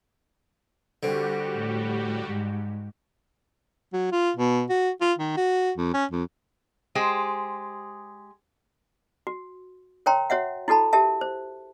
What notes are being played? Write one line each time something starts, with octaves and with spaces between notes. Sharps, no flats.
D3 G3 C4 F#4 G4
A2
G#2
F#3
F4
B2
F#4
F4
D#3
F#4
F2
C#4
F2
G#3 G4 G#4 C5
F#4
A#4 C#5 G5 A#5 C6
F#4 C#5 E5 F#5
E4 F#4 A4 A5 B5
G4 A#4 E5 A5
C5